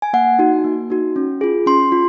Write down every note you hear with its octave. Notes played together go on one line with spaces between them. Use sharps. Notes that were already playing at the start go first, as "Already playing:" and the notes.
G#5
A#3 F#5
D#4 F#4
A#3
D#4 F#4
C#4
F4 G#4
C#4 C6
F4